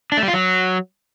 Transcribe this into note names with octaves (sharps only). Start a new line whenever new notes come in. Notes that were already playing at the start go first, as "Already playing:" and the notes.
D4
A3
G3
F4
F#3